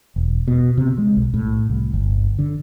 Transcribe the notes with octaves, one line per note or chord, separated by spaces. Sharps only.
E1
B2
C3
G#3
B1
A2
C2
G1
D3